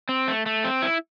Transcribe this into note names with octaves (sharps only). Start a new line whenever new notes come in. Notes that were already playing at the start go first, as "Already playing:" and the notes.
C4
A3
A3
C4
E4